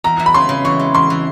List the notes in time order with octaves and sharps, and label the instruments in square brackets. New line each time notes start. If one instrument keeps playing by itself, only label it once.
[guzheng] E2 [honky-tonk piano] A#5
[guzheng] E3
[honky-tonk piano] B5
[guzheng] C#3 [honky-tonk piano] C6
[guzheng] C#3
[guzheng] E3 [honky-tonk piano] C#6
[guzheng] G#3
[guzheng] E2 [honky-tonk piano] C6
[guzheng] E3